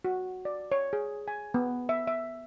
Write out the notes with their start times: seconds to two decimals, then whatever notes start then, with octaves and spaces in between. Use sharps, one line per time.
0.05 F#4
0.45 D5
0.72 C#5
0.93 G#4
1.28 G#5
1.54 B3
1.89 E5
2.07 E5